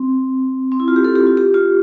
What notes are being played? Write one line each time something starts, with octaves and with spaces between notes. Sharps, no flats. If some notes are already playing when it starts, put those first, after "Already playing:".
Already playing: C4
C4
E4
F4
G4
A4
G4
F4
G4
F4